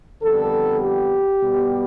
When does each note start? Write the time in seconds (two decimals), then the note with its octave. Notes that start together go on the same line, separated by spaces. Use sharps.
0.22 F2 D3 G3 B3 A4
0.81 G4
1.40 B2 G3 B3